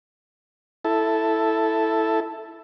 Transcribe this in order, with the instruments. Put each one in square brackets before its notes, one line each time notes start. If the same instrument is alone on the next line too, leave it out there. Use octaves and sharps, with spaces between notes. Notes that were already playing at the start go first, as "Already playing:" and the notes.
[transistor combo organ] E4 A4